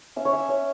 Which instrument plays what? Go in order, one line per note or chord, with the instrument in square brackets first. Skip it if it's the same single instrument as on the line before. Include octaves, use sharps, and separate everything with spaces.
[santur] C#4 E5
C#5
C#4 E5
C#4 C#5